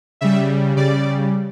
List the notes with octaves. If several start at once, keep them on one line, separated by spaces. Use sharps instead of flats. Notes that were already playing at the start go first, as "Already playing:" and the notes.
C#3 G3 E5
C#3 G3 D5